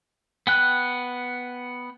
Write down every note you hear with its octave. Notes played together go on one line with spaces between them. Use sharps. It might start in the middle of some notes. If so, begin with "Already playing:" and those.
B3 G5 F#6